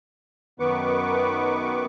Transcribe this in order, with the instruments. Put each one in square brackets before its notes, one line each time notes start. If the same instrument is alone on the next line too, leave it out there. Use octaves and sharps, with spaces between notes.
[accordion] F#2 D#3 B3 B4 C#6 D6